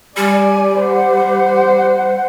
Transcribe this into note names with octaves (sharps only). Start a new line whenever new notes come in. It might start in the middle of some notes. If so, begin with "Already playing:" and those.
G3 G4 D5 G#5
C5 F#5